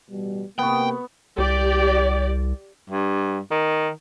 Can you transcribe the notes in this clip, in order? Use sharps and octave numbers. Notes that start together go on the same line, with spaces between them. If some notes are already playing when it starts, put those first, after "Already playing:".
A1 B2 G3
C3 A#3 B3 G5 C#6
C2 G4 D5
G2
D#3